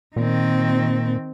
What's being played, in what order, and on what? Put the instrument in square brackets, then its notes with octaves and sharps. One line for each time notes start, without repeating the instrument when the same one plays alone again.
[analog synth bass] A#2 [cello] D#3 C4